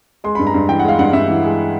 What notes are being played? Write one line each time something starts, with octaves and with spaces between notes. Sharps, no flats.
G#3 C6
G2 B5
A#5
G2
E3 G5
G#3 F#5
F5
G2 F#5
G2 E5
E3
G#3